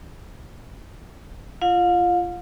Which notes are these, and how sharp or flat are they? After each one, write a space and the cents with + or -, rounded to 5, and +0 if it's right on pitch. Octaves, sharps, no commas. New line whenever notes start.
F4 -20 F5 +35